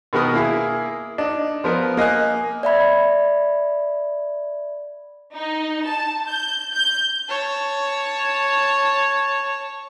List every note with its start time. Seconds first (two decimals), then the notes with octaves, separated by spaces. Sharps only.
0.13 B2 D#3 B3 A#4 D#6
0.34 A#3 E4 G#4
1.18 D4 D#4
1.64 F3 B3 A#4
1.97 A#3 D#5 G#5 F#6
2.63 D5 E5 B5 G#6
5.35 D#4
5.86 A5
6.27 G6
6.74 G6
7.28 C#5 A5